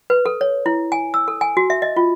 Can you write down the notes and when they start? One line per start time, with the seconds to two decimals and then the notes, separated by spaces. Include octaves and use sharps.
0.10 B4
0.26 A4
0.41 C#5
0.66 E4
0.92 G#5
1.14 E6
1.28 A4
1.41 G#5
1.57 F#4
1.70 E5
1.82 D#5
1.97 F4